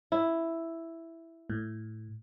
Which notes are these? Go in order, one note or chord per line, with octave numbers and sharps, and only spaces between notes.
E4
A2